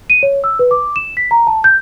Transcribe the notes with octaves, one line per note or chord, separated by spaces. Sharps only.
D#7
C#5
E6
B4
D6
E7
B6
A#5
A5
G6